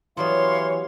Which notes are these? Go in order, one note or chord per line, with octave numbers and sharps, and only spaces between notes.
E3 F#3 G3 B3 C#5 F5 C6